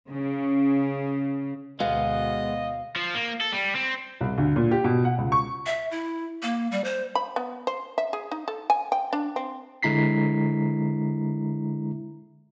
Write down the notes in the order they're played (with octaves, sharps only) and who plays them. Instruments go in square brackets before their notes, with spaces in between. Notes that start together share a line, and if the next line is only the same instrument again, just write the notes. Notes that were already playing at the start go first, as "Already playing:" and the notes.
[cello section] C#3
[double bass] D2 B2 [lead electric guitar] G#3 B3 [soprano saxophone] D#5 [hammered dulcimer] F5
[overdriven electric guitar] F3
A#3
A4
G3
C4
[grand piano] C2
D2
A#2
G4
B2
F#5
C#2
C#6
[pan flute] E5
E4
A#3
G3
C5
[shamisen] B5
B3
C5
E5
G#4
D#4
A4
G#5
G5
D4
C4
[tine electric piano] D3 G#3 E4 A#5 B6 C7